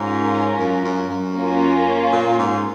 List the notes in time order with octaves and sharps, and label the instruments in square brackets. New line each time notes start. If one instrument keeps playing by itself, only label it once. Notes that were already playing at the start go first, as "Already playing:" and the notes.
Already playing: [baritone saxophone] G#2 [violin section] C#4 F4 A#4
[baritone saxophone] F#2
F#2
F#2
[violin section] A#3 C#4 F4
[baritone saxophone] A#2
G#2